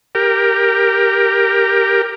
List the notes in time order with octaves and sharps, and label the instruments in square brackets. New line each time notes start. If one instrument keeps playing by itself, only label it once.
[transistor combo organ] G4 A#4